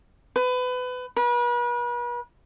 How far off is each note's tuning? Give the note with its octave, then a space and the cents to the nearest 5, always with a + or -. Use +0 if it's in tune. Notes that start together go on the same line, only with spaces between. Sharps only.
B4 +25
B4 -40